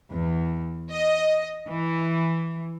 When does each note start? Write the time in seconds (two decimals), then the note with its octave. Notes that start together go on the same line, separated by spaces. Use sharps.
0.11 E2
0.90 D#5
1.67 E3